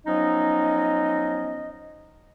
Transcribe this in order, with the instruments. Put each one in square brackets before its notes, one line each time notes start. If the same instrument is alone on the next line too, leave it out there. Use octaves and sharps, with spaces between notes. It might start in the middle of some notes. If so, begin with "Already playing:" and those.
[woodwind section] F3 F#3 B3 C#4 D#4 D#5